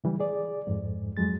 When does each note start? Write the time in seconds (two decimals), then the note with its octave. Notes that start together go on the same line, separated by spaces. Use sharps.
0.04 C#3 E3 G3
0.20 G#4 D5
0.67 F2 G#2
1.17 F2 F#3 G#3 A6